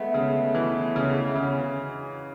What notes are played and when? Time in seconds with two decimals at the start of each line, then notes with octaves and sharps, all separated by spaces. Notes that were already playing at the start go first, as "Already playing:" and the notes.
Already playing: G#3 A3 B3
0.14 C#3
0.55 E3
0.96 C#3
1.35 C#3 B3 C#4